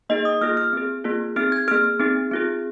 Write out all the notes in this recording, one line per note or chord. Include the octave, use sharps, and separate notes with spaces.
A#3 D#4 G#4 D#5
D#6
A#3 F4 G#4 F6
F6
C4 G#4
A#3 F4 G#4
C4 D#4 G#4 F6
G#6
A#3 G#4 F6
C4 D#4 G#4
C4 F4 G#4